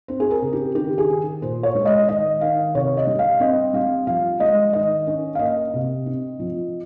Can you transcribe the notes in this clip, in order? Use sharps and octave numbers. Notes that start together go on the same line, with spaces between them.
C4 C5
G#4
A#4
C#3
G4
D#3 G4
G#4
D#3
A#2 C5
C#5
G#3
D#5
D#3 D#5
D#3 F5
C3 C#5
D#5
G3
F5
C4 D#5
G3 F5
F3 F5
G#3 D#5
D#3 D#5
C#4
F5
A#3 D#5
C3
C4
F3